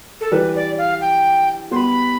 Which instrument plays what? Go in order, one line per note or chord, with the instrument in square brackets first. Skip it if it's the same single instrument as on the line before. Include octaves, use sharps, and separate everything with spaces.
[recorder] A4
[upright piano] E3 G3 [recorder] B4
[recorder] D5
F5
G5
[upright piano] G3 B3 [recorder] C6
[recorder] B5